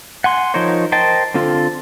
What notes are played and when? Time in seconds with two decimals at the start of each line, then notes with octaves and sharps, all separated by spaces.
0.24 F#5 G#5 C6
0.54 F3 D#4 A#4 C5 C#5
0.92 A#4 C5 D#5 G5 A5
1.34 D3 C4 F4 A4